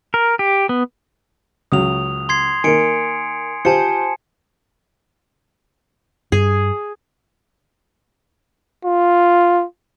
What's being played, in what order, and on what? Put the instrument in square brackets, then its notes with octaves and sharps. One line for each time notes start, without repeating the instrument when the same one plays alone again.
[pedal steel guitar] A#4
G4
B3
[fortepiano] C#2 C#3 F#3 [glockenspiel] D#6 F7
[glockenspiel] C6 G#6 C7
[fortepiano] D#3 A#3 [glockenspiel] G#5 C#7 D7
[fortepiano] F4 G4 C5 [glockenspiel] G#5 A5 C#7
[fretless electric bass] G2 [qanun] G#4
[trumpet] F4